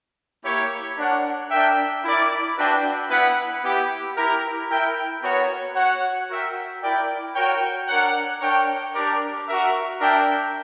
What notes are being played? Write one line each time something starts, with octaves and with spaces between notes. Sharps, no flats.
A#3 E4 G4 C#5
D4 A#4 C#5 F#5
D4 A#4 E5 G5
E4 A#4 D5
D4 F#4 B4 E5 G5
B3 E4 B4 F#5
B3 E4 G4
E4 G4 A#4
E4 A#4 E5 G5
B3 F#4 A#4 C#5
F#4 C#5 F#5
F#4 A#4 E5 G5
E4 A#4 D5 G5
F#4 A#4 C#5 G5
D4 A#4 C#5 F#5
D4 A#4 C#5 G5
D4 G4 A#4 D5
F#4 A#4 E5
D4 A#4 E5 G5